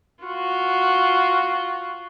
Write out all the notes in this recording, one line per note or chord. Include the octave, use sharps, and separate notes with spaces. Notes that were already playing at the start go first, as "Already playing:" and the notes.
F4 F#4